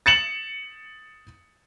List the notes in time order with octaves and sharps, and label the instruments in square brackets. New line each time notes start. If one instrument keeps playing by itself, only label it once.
[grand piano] A6 C#7 E7 F#7